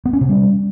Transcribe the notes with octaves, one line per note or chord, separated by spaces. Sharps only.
B3
C#4
C3
G3